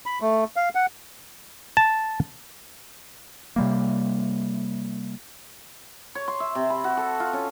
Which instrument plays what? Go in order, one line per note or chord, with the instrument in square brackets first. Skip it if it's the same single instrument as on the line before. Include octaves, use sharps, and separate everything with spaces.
[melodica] B5
A3
F5
F#5
[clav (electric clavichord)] A5
[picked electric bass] C3 G3 A#3
[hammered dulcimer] C#5
C6
E5
C3
B5
F#4
A4
F4
C#4